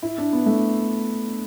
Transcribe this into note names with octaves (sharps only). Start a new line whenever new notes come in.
E4
D4
B3
A3